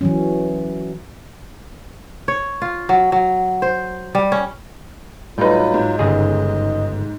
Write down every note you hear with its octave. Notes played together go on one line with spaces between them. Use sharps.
E3 F#3 C#4
C#5
F4
F#3
F#3
C5
G3
C#4
A2 F#3 G3 D#4 F4 B4
G#2
G1 C#3 G#4 D#5